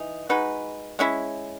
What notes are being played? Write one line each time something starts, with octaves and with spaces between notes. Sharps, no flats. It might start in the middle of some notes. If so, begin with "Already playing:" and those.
Already playing: E3 D#4
G#3 D#4 F#4 B4
G#3 C#4 E4